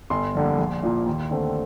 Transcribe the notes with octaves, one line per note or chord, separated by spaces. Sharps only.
G1 C6
F2 D3 G3 A#3
A#1
A#2 F3 A#3
D#2
D3 A3 C4